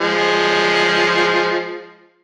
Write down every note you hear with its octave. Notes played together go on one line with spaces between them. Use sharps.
F3 G#3